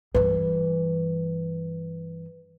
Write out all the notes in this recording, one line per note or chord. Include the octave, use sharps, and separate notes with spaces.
G2 E3 B4